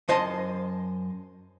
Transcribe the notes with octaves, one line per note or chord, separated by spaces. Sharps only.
F#2 C5 D#5 A5